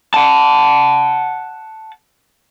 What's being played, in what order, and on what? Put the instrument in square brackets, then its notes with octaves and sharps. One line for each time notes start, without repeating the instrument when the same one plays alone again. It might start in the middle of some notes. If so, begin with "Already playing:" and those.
[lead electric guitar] F#5 A5